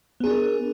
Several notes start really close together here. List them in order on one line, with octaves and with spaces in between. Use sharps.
B3 G#4 D4 A#4